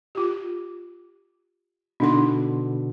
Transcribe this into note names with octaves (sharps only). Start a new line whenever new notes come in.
F4 G4
B2 D3 D4 D#4 C6